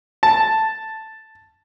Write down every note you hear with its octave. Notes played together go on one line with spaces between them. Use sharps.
A5